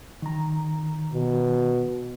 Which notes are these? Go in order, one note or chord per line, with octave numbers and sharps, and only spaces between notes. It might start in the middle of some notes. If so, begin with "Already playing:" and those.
D#3 A#5
B2